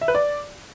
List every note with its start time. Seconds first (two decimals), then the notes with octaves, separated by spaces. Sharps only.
0.01 E5
0.08 B4
0.15 D5